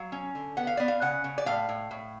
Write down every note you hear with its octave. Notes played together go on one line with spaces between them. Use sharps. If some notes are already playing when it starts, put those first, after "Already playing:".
Already playing: F#3 F5
C#4
D3
B3 F#5
F5
B3 D5
F5
C#3 F#5
C#3
D5
A2 F5
A2
A2